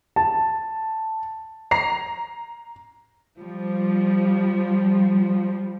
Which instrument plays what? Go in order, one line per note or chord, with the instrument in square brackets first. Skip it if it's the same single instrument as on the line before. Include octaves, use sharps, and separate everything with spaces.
[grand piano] A5
[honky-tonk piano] A#5 C7
[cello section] F3 G3